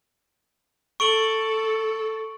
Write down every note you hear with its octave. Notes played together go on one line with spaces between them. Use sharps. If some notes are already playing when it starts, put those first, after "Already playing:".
A4 C#6 D7 F#7